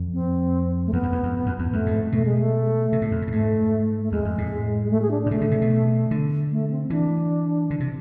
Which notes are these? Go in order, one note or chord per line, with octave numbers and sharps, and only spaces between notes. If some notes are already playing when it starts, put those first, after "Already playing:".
Already playing: F2
C4
A3
E2 B3
E2
F2
F2
F2
E2
F2 A3
G#2
B2 A3
G#3
A3
C3
A2
F2
G#2
A2
G#2 A3
A3
E2 G#3
F2
A2
G#3
A3
G#4
D4
D4
A2
B2 A3
D3
C3
B2
D3
A3
C4
E3 D4
D3
C3